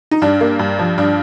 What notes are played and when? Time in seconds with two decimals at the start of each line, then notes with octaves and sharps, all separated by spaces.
0.11 D#4
0.22 G2 D4
0.41 A#3
0.59 G2
0.79 F3
0.98 G2 D4